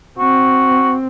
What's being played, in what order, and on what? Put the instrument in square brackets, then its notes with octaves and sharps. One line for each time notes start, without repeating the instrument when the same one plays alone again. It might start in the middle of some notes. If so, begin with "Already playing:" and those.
[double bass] C4 [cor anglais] F#4